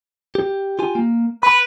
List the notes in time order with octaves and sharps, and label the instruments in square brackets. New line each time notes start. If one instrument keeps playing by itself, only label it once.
[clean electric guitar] G4
F4 G4 G#5
A#3
[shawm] B4 [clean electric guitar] B5